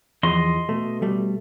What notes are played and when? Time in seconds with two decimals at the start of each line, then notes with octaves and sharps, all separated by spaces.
0.23 E2 F3 D#5 C6
0.69 B2 A3
1.02 G3 A3